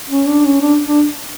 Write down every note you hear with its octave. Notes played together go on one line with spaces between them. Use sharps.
C#4
D4
C#4
D4
D4